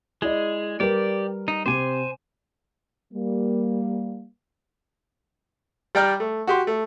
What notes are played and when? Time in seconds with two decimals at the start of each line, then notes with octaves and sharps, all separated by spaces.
0.22 G#3 E4 G#4 D5 D#5
0.80 G3 G4 A#4 B4 D5
1.48 D#4
1.66 C3 C4 C5 G#5 D6
3.13 G3 A#3
5.95 G3 D5 G5 A#5 F6
6.20 A3
6.47 F#4 G4 C6
6.67 A3